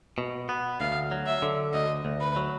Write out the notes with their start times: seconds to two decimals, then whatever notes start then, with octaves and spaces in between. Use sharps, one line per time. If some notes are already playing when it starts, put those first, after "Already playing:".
0.18 B2
0.49 B3
0.80 D2 F5
1.11 F#3
1.27 E5
1.42 D3
1.74 D2 D#5
2.05 D2
2.21 B4
2.36 F#3